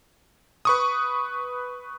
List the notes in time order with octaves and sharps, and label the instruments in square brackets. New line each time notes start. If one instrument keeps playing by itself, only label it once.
[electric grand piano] B4 C#6 D#6